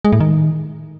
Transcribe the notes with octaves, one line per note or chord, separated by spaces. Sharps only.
G#3
A2
D#3